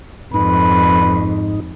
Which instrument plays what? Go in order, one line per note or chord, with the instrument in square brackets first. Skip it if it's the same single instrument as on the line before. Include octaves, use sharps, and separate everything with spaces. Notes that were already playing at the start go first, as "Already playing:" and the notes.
[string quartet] F2 [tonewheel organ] G#2 D#4 [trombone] B4